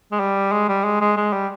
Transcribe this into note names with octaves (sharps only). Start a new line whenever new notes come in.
G#3
G3
G#3
G3
G#3
G#3
G#3
G3